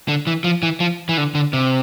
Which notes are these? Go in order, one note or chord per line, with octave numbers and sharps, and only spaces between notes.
D3
E3
F3
E3
F3
E3
D3
D3
C3